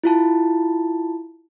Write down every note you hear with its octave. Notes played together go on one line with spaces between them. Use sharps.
E4 F4 A5